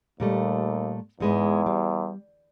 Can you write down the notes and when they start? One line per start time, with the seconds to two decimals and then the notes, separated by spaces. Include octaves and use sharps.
0.20 D#2 A#2 G3 A3
1.20 E2 G#2 G#3 B4
1.66 G3